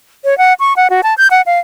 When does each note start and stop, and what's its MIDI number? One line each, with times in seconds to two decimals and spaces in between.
0.24 0.37 73
0.38 0.54 78
0.60 0.73 85
0.77 0.88 78
0.90 1.01 66
1.03 1.14 81
1.18 1.27 91
1.31 1.42 78
1.46 1.59 77